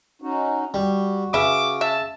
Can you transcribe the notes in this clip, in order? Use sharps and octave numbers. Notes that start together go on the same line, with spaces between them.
C#4 D#4 F#4
G3 F#4
C#3 B4 E5 D6
E5 A5